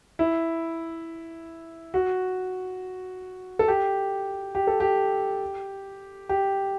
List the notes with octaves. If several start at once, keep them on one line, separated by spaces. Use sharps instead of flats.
E4
F#4
A4
G4
G4
A4
G4
G4